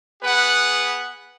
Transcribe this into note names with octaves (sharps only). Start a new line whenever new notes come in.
B3 G#4 B4 F#5